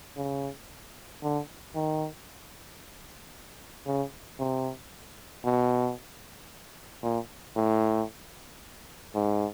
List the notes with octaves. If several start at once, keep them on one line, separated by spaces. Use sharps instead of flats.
C#3
D3
D#3
C#3
C3
B2
A#2
A2
G#2